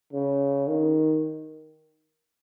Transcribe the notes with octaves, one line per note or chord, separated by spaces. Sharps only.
C#3
D#3